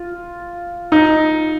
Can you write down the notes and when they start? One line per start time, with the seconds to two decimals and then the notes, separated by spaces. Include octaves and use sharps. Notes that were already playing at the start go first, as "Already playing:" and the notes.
Already playing: F4
0.92 D#4